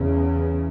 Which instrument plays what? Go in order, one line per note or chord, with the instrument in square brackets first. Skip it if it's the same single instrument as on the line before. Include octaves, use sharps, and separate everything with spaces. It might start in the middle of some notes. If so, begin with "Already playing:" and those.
Already playing: [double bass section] E2 C#3